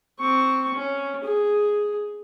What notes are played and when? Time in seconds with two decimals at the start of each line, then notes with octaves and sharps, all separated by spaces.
0.20 C4 C#6
0.74 C#4
1.24 G#4